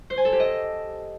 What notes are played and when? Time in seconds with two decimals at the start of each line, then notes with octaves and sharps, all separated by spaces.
0.10 C5
0.18 G#5
0.25 A4
0.32 G4
0.40 D#5